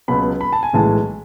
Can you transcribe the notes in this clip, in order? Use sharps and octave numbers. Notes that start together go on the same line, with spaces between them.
C#2 B2 F#3 B5
B5
A5
G#5
B1 A2 E3 G#3 A5